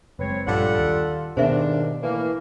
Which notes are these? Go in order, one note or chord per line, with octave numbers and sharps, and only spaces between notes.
F#1 G#3 C4 B4 C#5
A#1 G2 G3 D4 F4 A4 F#5
D#2
D#2 G#2 B2 D#3 B3 D4 C5 E5
A2 E3 A3 A#3